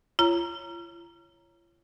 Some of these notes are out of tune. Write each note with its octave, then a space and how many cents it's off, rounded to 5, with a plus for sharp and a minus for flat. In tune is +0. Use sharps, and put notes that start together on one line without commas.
F4 -40 C#5 +0 A#5 +0